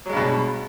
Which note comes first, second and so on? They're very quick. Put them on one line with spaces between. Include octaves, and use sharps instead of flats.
F#3 G#3 G2 B2